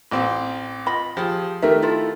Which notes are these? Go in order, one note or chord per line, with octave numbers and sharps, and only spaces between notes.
A1 C4
F4 D#5 B5
F3 G4 G#4
D#3 A3 G4 A#4 E5
E4 F4 A4